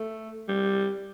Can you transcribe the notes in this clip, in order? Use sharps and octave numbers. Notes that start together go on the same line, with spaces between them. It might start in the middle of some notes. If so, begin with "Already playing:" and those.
Already playing: A3
G3